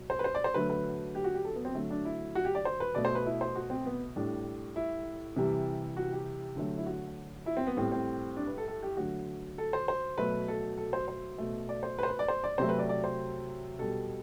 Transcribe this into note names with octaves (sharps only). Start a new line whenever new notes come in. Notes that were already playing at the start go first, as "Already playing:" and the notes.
Already playing: B2 F#3
C5
B4
C5
D5
C5
D3 F#3 A3 B4
B4
G4
F#4
G4
A4
B3
C4
D3 F#3 A3
D4
E4
F#4
G4
D5
C5
B4
B2 A3 D5
C5
B4
E4
C5
F#4
C4
B3
A2 G3 D4
E4
C3 E3 G3
F#4
G4
D3 F#3 A3
E4
F#4
E4
C4
B3
A2 G3 C4
C4
D4
B4
A4
A4
G4
D3 F#3 A3 F#4
A4
C5
C5
B2 F#3 A3 B4
A4
A4
C5
C5
B2 A3
D5
C5
B4
C5
B4
D5
C5
D5
C3 F#3 A3 C5
B4
D5
D5
C5
B2 G3 A4